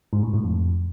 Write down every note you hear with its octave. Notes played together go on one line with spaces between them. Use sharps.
G#2
A2
A2
F2